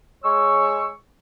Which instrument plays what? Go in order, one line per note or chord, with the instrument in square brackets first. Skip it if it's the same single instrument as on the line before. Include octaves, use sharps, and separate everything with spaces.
[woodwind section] G#3 C#5 C#6 E6